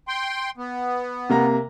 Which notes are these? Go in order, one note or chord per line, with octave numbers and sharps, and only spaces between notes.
G5 C6
B3
C3 A#3 A#5